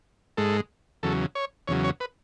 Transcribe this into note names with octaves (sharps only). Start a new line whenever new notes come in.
G#2 G#3 A4
E2 C#3 F#3 A4
C#5
E2 C#3 F#3 C#5
C#5
B4